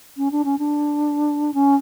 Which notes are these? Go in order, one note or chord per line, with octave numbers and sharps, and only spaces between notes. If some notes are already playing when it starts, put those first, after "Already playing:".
C#4
D4
C#4
D4
C#4